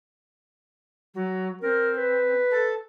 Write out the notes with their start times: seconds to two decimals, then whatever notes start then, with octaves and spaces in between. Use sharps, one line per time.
1.14 F#3
1.62 C4 A#4
1.97 B4
2.51 A4